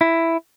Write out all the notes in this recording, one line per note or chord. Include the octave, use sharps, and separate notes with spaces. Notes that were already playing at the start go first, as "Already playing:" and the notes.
E4